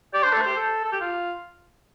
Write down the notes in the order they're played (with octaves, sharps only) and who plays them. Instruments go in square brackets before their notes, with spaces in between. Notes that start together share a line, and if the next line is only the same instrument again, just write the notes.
[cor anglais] G4 [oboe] D5
[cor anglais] D4 [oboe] C5
[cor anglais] A3 [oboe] A4
[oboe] C5
[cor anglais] G4
A4
A4
G4
F4